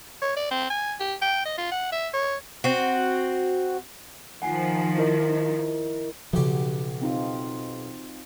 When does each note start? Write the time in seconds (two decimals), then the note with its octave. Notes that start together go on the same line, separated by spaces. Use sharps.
0.22 C#5
0.36 D5
0.51 C4
0.70 G#5
1.00 G4
1.22 G5
1.45 D#5
1.58 F4
1.71 F#5
1.92 E5
2.13 C#5
2.64 C4 F#4
4.42 D#3 F3 F#5 G#5 C7
4.98 E4 A#4 D#5
6.33 B1 C#3 F3 F#4 G4
7.01 C4 D#4 F4